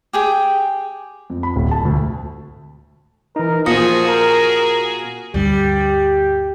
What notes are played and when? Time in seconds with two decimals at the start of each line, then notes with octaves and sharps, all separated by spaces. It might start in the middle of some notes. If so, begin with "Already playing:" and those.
0.13 G4 G#4 G5
1.30 F2
1.43 B5
1.56 D1
1.71 A5
1.85 D2
3.36 E3 D#4 A#4
3.66 A#2 F3 F#4 G#4 D#6 A#6 C#7
4.08 A#4
5.34 D2 G2 G3 G4